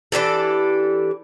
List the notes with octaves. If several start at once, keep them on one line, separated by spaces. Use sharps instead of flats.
E3 D4 G4 A4